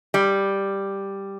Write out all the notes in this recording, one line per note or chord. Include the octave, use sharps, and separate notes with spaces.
G3